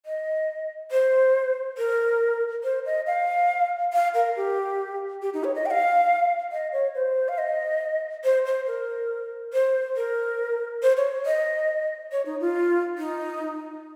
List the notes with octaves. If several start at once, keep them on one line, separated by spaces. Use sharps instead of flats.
D#5
C5
A#4
C5
D#5
F5
F5
A#4
G4
G4
D#4
C#5
D#5
G5
F5
D#5
C#5
C5
F5
D#5
C5
C5
A#4
C5
A#4
C5
C#5
D#5
C#5
D#4
F4
D#4